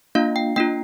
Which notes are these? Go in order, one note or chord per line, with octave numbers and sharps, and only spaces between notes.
A#3 D4 F4 F5
G5
A#3 D4 F4 G5